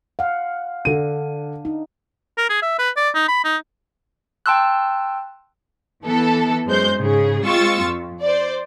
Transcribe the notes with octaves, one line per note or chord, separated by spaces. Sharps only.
F5 F#5
D3 D4 D#7
D#4
A#4
G#4
E5
B4
D5
D#4
B5
D#4
G5 A5 C6 E6 F#6
E3 B3 A4
F#2 G#3 C5 G6
G#2 C#3 G#4
G#3 C4 F4 C#6 E6 A6
F2
C5 D5